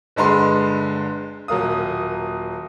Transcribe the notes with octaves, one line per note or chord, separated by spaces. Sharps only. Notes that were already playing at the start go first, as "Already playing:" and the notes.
G1 D3 G#3 B4 C6
D#1 F#3 A#3 D#6